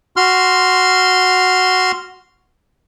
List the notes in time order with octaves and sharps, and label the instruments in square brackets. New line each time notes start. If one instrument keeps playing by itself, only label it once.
[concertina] F#4 C6 F6